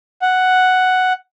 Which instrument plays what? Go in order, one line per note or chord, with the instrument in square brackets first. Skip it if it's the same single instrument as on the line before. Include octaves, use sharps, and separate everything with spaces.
[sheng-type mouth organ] F#5